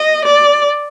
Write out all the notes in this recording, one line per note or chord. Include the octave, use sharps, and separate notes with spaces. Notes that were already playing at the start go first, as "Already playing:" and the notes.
Already playing: D#5
D5